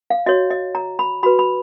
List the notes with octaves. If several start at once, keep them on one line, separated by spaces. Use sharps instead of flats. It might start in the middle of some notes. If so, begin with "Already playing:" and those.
F5
F#4 C#5 D#5
D#5
A#5
B5
F#4 B4 B5
B5